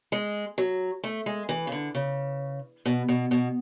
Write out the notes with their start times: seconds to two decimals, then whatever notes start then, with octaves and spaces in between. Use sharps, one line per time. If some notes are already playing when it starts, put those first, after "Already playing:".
0.12 G#3
0.58 F#3
1.04 A3
1.26 G#3
1.49 E3
1.67 C#3
1.72 D3
1.95 C#3
2.86 B2
3.09 B2
3.31 B2